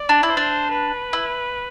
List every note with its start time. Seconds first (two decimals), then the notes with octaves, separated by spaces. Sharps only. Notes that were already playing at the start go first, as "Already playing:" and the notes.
Already playing: D5
0.09 D4
0.23 E4
0.30 C5
0.37 D4
0.72 B4
1.13 E4